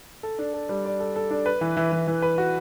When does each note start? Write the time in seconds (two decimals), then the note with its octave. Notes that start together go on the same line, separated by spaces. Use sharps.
0.23 A4
0.39 D4
0.54 A4
0.69 G3
0.85 D5
1.00 A4
1.16 A4
1.31 D4
1.46 B4
1.61 E3
1.77 E3
1.92 E3
2.07 E3
2.22 B4
2.38 F#4